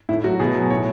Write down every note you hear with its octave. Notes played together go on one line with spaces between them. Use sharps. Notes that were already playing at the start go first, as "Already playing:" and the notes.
A2 E4
F#3 F#4
B2 G#4
F#3
A2 C#5